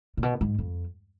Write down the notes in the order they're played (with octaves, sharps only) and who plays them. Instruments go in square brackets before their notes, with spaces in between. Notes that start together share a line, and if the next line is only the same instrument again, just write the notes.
[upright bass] A#2
B2
G#2
F2